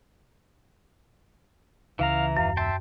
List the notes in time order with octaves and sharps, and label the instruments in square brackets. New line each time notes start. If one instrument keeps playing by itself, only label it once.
[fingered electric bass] C#2 C#3 [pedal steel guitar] E3 E4 A#5 [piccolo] F5
[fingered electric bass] D#1 [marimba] F#2 [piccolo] F5
[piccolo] E5 [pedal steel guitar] G5 A5 C6